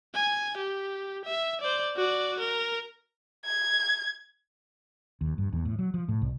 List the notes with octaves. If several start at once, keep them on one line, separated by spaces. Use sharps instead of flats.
G#5
G4
E5
C5 D5
F#4 D5
A#4
G#6
D#2
G2
E2
A2
F#3
F3
A2
C2